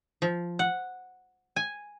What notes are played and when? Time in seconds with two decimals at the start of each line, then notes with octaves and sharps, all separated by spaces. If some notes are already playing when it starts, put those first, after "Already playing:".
0.22 F3
0.59 F#5
1.56 G#5